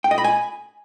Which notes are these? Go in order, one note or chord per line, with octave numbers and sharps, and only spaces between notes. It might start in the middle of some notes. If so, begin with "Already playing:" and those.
G5
D#5
B5
G#5